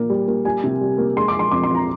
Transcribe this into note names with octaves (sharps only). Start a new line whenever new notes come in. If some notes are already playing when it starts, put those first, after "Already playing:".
Already playing: A#2 A#3
G3
A#3
G3 G#5
C3
G3
A#3
G#3 C6
D6
G#3
C6
F2 D6
C6
F2
A#5